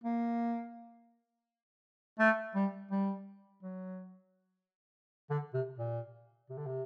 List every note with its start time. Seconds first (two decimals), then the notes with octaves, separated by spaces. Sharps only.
0.04 A#3
2.19 A3
2.55 G3
2.91 G3
3.63 F#3
5.30 D3
5.54 C3
5.78 A#2
6.50 C3
6.57 D3
6.66 C3